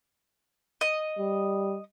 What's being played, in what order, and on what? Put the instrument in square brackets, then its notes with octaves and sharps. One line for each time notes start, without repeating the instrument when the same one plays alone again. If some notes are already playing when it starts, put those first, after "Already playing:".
[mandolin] D#5
[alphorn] G3